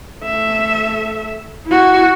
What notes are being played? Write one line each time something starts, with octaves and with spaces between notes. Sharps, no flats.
A3 E5
E4 F#4